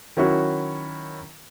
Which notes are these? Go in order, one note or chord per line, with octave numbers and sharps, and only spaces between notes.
D#3 F#3 C#4 E4 F#4